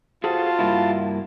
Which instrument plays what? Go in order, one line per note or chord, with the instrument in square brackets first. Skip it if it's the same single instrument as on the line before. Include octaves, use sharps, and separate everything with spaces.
[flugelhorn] F4 [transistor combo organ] F#4 A5 [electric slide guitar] G#4 A4 C5
[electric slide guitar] G2 A#3 E4